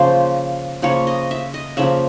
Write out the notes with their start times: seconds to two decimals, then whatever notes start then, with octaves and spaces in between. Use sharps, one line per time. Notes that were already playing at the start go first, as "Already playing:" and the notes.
Already playing: C#3 F3 A#3 C5
0.82 C#3 F3 A#3 C#5
1.07 D#5
1.31 E5
1.54 D#5
1.77 C#3 F3 A#3 E5